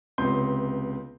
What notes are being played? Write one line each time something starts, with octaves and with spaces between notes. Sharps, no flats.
C#2 C3 B3 C6 G6